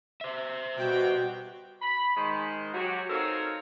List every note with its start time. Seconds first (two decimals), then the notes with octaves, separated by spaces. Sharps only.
0.21 C5 E5
0.78 B2 G3 F#4 G5
1.81 B5
2.16 D#3 G#3 C5
2.73 F#3 F#4 G4
3.09 C4 D#4 A4 A#4 C#5 F5